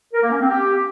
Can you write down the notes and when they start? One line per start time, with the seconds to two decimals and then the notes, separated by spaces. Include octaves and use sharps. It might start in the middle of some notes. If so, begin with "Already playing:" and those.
0.13 A#4
0.22 A#3
0.31 C#4
0.40 C4
0.49 G4